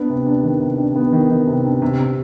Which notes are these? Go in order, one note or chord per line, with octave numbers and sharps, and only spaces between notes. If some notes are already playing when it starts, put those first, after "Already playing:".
Already playing: B3 D4
C3
D4
D#3
C3
D4
B3
D#3
D#3
C3
D4
C3
C3